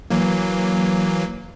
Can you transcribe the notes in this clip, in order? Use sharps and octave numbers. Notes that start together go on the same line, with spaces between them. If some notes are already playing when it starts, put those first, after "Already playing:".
E3 F#3 A#3